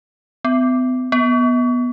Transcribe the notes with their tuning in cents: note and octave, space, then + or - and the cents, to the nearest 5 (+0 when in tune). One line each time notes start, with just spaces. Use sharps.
B3 +45
B3 -10